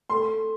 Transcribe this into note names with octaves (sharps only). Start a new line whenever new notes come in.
A3 C6